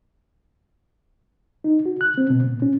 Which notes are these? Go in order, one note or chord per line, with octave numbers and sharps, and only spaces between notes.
D#4
F#4
F#6
C4
B2
A#2
C#4